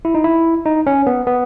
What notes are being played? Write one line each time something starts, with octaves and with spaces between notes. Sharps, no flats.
E4
D#4
E4
D#4
C#4
B3
B3